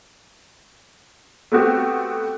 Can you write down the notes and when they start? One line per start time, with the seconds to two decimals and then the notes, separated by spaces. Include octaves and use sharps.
1.52 A3 B3 C4 F#4 G4